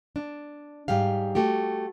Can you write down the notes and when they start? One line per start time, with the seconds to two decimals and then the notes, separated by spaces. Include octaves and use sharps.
0.16 D4
0.88 G#2 G3 G4 F5
1.35 A3 F#4 G4